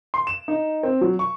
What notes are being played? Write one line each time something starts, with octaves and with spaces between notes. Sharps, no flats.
C6
E7
D#4
C4
F#3
C#6